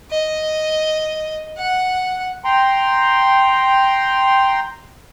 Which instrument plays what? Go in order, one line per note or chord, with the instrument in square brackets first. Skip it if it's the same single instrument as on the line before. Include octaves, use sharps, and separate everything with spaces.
[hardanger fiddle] D#5
F#5
[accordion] G5 A#5 C6